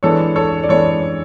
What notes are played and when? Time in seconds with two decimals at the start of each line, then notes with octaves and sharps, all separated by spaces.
0.03 E3 G#3 B3 D4 A4 C#5
0.36 A4 C#5
0.64 D5
0.69 E3 G#3 B3 D4 A4 C#5